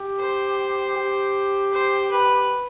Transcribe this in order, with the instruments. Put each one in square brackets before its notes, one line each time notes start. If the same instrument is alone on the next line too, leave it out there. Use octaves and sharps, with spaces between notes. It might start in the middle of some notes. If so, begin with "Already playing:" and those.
Already playing: [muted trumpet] G4
[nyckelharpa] C5
[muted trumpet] G4
[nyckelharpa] C5
B4